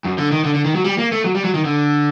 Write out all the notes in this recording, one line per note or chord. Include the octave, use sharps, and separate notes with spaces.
F#2
D3
D#3
D3
D3
D#3
F#3
G3
A#3
A3
F#3
G3
F#3
D#3
D3